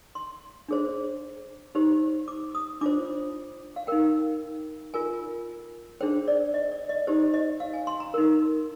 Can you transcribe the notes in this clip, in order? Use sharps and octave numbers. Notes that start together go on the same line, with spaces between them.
C6
D4 G#4 C5
D#4 G4 C5
D6
D#6
D4 F4 C5 D6
F5
D#4 A#4 G5
F4 A#4 G#5
D4 G#4 C5 G5
D5
D#5
D5
D#5
D#4 G4 C5
D#5
F5
G#5
C6
A#5
D#4 A#4